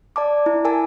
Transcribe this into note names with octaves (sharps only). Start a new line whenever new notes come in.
D5 A5 D6
E4
A#4 G#5 A5